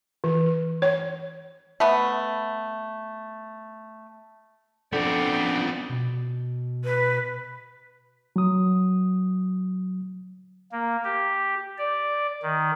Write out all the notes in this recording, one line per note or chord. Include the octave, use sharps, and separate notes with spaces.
E3
C#5
A3 B3
F3 B3 C4 D4 A4 D5 G5
B2
B4
F#3 D#6
A#3
G4
D5
D#3